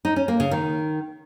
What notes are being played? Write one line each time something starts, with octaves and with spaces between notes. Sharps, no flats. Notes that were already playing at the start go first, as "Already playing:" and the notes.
D#4
C#4
A#3
C#3
D#3